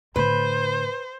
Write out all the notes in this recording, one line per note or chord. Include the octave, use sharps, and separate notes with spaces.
A2 D3 B4 C5